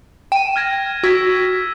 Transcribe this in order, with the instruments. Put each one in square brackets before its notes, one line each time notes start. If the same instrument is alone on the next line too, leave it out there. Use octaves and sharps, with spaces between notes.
[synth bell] G5 [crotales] D#7 E7
[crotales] F6 G#6 A#6
[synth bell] F#4 [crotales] E6 G#6 B6